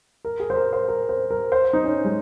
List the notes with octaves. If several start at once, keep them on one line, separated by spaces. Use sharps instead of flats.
A#4
G#4
C5
A#4
C5
A#4
C5
A#4
C5
D#4
C#4
G#3